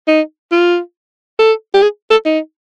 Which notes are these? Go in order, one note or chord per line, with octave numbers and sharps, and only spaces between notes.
D#4
F4
A4
G4
G#4
A4
D#4